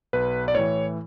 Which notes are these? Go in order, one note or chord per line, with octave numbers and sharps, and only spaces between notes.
B1 B4
D5
A2 E3 C#5